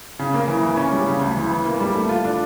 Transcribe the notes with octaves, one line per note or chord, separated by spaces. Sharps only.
C#3
A#3
E3
E3
C#4
G3
C#3
D2
E3
E3
A#3
G3
A3
F4
D4